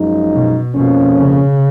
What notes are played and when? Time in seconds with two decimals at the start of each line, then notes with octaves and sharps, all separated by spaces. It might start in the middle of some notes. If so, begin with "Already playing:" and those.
Already playing: F#2 F3 G#3 D#4
0.33 B2
0.75 F2 B2 F3 A#3 C#4
1.17 C#3